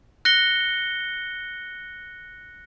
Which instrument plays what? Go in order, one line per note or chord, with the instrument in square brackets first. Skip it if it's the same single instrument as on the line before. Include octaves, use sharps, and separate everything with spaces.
[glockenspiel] F#6 A#6 C#7 G7